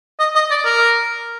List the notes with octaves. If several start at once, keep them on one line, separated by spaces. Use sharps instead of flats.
D#5
D#5
D5
A#4